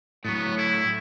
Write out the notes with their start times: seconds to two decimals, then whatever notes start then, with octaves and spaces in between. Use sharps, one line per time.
0.25 A2 F#3 B3
0.58 E4